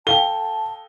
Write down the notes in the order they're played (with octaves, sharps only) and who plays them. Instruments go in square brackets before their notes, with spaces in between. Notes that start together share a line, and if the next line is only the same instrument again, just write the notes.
[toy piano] A4 F5 G5 [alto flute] A5 [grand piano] G7